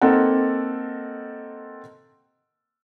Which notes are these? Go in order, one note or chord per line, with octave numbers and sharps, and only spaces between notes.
A#3 C4 D#4 A4 F#5